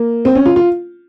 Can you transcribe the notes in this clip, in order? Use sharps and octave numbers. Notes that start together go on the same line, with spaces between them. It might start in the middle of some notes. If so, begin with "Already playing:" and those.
Already playing: A#3
C4
C#4
F4
F4